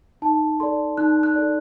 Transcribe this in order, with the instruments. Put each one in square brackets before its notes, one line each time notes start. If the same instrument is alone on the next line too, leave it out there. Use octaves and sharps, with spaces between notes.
[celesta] D#4 A5
A4 D5 C6
D#4 F#6
F#6
A4 D5